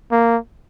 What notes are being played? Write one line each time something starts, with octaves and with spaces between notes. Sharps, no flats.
A#3